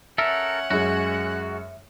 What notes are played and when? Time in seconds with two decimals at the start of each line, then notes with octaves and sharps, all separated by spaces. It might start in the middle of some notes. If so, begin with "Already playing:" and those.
0.18 C#4 A4 A#4 E5 F#5 E6
0.70 F#2 G#3 F#4